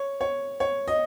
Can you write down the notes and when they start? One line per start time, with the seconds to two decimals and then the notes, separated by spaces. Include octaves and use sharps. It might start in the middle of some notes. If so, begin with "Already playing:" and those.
Already playing: C#5
0.21 C#5
0.60 C#5
0.88 D#5